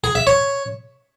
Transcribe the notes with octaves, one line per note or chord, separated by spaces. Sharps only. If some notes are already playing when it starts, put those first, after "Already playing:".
G#4
E5
C#5